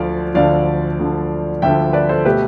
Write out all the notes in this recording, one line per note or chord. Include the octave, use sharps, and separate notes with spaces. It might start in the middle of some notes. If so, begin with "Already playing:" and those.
Already playing: D2 D3 F3 D5 F5
D2 D3 F3 D5 F5
D2 D3 F3
D2 D3 F3 E5 G5
B4 D5
A4 C5
B2 A3 G4 B4